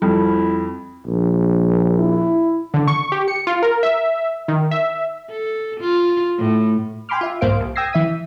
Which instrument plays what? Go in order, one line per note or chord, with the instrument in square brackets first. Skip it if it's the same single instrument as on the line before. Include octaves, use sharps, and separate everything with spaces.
[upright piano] F2 [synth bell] G3 [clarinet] E4
[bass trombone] A#1
[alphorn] E4
[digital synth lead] D3
C#6
G4
C#7
F4
A#4
E5
D#3
E5
[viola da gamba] A4
F4
A2
[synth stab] G5 G#5 B5 C6 D6 F6
F4 E5
B1 G#2 A#3 C5 F5 D7
C2
G5 D#6 E6 G#6 A#6 C7
E3 E5 B6 D#7